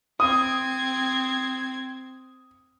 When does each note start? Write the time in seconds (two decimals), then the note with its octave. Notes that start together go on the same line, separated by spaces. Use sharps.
0.20 C4 D#6 G#6